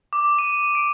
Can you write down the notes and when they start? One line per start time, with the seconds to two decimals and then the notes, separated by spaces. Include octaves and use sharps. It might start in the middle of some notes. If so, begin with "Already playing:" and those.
0.13 D6
0.39 D#7
0.75 D7